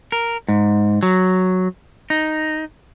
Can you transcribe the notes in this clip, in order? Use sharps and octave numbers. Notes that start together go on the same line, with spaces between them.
A#4
G#2
F#3
D#4